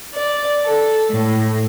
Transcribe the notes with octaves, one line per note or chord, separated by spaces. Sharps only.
D5
A4
A2